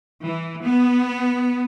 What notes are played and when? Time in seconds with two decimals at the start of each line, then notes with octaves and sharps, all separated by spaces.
0.24 E3
0.64 B3